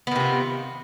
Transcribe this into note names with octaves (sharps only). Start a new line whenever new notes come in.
C3 D#3 B3 F4